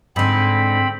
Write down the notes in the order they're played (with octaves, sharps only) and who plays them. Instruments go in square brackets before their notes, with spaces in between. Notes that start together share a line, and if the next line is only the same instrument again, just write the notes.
[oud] G#2 D3 [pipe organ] C4 B5